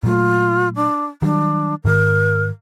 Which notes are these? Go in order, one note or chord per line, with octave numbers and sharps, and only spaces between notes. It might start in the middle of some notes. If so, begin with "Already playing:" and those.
A#2 F#3 A3 F4
D4
D#3 F#3 G3 D4
G#2 D#3 A#4